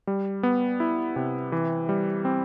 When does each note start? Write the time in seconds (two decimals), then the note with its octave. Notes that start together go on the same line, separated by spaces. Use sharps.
0.07 G3
0.43 B3
0.80 E4
1.16 C3
1.52 E3
1.89 G3
2.25 C4